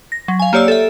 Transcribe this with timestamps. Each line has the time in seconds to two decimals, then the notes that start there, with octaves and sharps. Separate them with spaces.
0.12 A#6
0.28 F#3
0.39 F5 G#5
0.53 A#3 G4 C#5 D5 E6
0.68 A4 E5